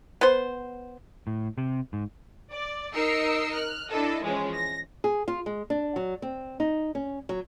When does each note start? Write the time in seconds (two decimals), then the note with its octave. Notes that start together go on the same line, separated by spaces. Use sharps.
0.21 B3 C5
1.27 A2
1.58 C3
1.93 G#2
2.51 D5
2.94 D#4 A#4 D#5 E6 C7 C#7
3.53 F6 F#6
3.89 D4 E4 A4 D#5
4.23 E3 F3 G#3 C#4
4.54 A#6
5.04 G#4
5.28 F4
5.46 G#3
5.70 D4
5.96 F#3
6.22 C4
6.60 D#4
6.95 C#4
7.29 F#3